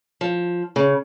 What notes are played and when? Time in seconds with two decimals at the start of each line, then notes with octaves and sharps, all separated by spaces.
0.21 F3
0.76 C#3